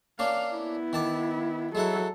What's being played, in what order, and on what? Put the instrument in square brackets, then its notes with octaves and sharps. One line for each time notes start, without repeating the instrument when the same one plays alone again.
[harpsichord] A#3 C#4 D4 [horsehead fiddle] F5
[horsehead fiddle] B3 E4
[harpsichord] D#3 A5 D6
[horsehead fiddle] F#3 A4 [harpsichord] G#3 E4 F#5